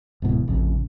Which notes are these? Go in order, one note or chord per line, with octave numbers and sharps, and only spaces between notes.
D1 G#2 B2 E3
A1 F2 C#3